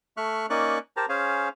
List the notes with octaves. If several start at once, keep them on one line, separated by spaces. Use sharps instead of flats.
A3 E5 C#6 F6 F#6
A#3 C#4 D#4 D5 C#6 F#6
G4 A#4 C5 A5 A#5
C#4 G#4 C5 C#5 F5